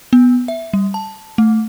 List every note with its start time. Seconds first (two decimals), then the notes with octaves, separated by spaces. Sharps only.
0.13 B3
0.48 E5
0.73 G3
0.94 A5
1.38 A3